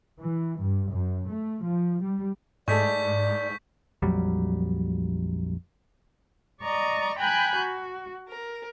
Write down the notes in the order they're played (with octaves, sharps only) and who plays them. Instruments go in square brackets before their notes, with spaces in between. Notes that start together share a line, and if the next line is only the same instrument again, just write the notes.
[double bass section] E3
G2
F#2
A3
F3
G3
[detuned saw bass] G#2 [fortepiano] G#3 A3 [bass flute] D5 [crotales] C#6 G6 B6
[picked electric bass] A#1 F2 F#3 G3
[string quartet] D5 D#5 A#5 C#6
G5 G#5 A#5 B5 F#6 G6
F#4
A#4